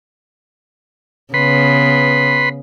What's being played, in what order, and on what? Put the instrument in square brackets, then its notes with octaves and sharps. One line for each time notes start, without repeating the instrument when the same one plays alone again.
[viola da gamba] C#3 B3 [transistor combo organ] B4 B5 C6